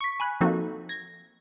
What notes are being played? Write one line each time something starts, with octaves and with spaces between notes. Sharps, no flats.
C#6 B6
G#5 B5 F#6
F3 A#3 C4 D#4 F#4 A4
G#6 A#6